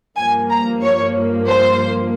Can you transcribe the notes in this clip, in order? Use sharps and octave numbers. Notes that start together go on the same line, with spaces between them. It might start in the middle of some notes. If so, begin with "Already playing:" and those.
G2 F3 A#3 G#5
A#5
C#5
C5